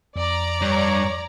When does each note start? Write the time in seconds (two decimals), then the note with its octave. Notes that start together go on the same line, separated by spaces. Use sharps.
0.16 F2 D5 A#5
0.62 G2 C#5